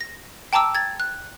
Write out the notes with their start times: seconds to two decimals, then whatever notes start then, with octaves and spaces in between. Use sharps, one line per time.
0.01 A#6
0.53 G5 A5 A#5 D6 E6
0.75 G#6 A6
1.00 F#6